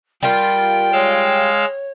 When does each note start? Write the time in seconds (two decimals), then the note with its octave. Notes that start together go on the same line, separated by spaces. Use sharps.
0.23 G3 F4 A#4 G5
0.92 G#3 C#5 F5 E6